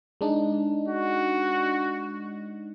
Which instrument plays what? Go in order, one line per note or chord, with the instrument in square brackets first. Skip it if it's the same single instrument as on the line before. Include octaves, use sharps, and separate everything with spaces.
[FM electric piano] G#3 D4 D#4
[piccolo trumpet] F#4